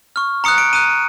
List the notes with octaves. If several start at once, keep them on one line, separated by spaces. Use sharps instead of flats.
C#6 F6
A#5 D#6 F#6 C#7
D7
A#5 D#6 F#6 D#7